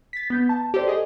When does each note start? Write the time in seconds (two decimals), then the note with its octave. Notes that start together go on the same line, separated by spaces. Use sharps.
0.13 A6 B6
0.30 B3 G6
0.49 A5
0.74 G4 A4 C5 D5
0.88 G#4 D#5